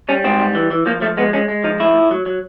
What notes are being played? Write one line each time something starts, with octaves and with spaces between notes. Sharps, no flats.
G3 C#4
G#2 C4
G3
E3
E3
F3 A#3
F3 A3
G#3 B3
G#3 C#4
G#3
F3 D#4
A2 E4
A2
F#3
F#3